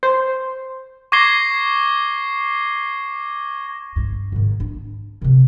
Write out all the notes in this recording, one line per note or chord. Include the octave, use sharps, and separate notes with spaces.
C5
C#6 D6 G#6 A#6 C7 G7
G2 A3
G#2 D#3
D4
C3 D#3